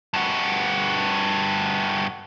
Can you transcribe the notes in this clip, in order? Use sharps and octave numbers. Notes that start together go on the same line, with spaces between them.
G2 F#4